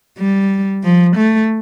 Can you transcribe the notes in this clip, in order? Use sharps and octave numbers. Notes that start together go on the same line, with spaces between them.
G3
F3
A3